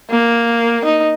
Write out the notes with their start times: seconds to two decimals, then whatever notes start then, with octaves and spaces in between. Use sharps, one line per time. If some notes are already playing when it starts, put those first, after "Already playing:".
0.10 A#3
0.85 D#4